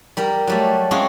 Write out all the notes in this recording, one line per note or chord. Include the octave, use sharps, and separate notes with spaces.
G3 A#4 A#5
F#3 G3 A3
G#3 C4 C#4 F4 F#4 G#4